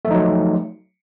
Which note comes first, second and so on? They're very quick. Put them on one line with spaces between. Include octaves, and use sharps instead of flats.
A3 F3 D#4 F#3